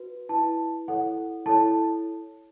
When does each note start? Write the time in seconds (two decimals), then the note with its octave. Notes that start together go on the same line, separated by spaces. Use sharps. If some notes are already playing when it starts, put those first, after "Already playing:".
Already playing: F#4 B4
0.29 E4 B4 A5
0.88 E4 A4 C#5 F#5
1.46 E4 A4 C#5 A5